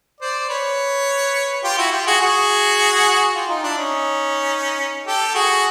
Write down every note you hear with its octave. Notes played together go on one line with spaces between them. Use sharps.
C5 D5
B4 C#5
F4 G4
E4 F#4
F4 G4
F#4 G#4
F#4 G#4
F4 G4
D#4 F4
D4 E4
C#4 D#4
G4 A4
F#4 G#4